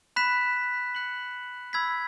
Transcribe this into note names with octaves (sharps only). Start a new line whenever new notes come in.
B5 F#6 B6 E7
F#6 C#7 F#7
B5 E6 G#6 B6